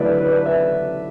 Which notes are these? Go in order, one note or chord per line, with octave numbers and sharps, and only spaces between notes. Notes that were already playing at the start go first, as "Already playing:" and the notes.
Already playing: D3 F#3 A3 E4 B4 D5 E5
B4
D5
B4
E5